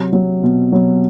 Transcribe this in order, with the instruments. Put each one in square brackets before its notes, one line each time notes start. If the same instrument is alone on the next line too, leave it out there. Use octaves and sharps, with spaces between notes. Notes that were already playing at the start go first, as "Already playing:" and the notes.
Already playing: [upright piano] C3 F#3
F#3
B2
F#3